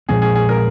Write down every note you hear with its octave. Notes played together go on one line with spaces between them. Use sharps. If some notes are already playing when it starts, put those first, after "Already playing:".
A#2 F3 G#3 C4 G#4
G#4
G#4
A#4